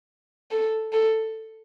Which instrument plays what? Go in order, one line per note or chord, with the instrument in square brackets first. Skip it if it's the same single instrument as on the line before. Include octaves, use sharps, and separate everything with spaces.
[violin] A4
A4